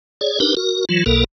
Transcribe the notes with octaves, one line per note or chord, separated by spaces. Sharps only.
G#4 C#5 D5
D4 D#4 G4 A#4 B4
F#4 A#4
E3 F#3 F4
B1 B2 A#3 A4 A#4